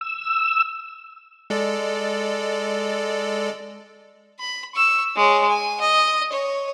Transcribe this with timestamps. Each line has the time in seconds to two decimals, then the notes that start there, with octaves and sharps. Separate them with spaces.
0.01 E6
1.50 G#3 A4 D5
4.40 B5
4.75 C#6 E6
5.16 G#3 C#5
5.49 G#5
5.81 D#5
6.33 C#5